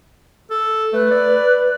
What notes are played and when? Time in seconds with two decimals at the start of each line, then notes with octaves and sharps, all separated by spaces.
0.51 A4
0.93 A3 B4
1.11 D5